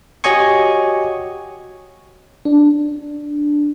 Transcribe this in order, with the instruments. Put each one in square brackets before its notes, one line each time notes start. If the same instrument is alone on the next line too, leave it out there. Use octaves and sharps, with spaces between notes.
[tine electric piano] F#4 G4 C#5 D#5 G#5 C#6
[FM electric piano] D4